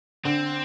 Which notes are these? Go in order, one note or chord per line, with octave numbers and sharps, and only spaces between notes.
D3 C4